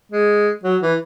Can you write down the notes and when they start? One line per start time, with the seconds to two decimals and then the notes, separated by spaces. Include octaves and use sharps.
0.12 G#3
0.64 F#3
0.82 E3